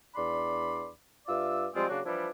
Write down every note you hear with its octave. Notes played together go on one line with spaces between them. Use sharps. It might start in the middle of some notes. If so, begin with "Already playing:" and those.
E2 D4 D5 B5 C6
G2 F4 D5 E5 E6
F3 G3 G#3 C4 F4
C#3 F#3 A#3 D4 F#4
E3 F3 G3 D4 E4